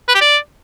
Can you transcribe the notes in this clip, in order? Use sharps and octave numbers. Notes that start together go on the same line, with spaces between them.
B4
G4
D5